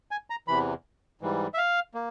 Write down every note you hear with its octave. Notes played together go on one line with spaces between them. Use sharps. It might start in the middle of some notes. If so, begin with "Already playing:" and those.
G#5
A#5
E2 C3 E3 B5
G#2 E3 G3
E5
F5
A#3